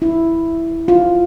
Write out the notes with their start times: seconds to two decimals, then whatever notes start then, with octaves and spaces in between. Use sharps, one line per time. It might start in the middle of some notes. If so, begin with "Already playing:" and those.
0.02 E4
0.88 F4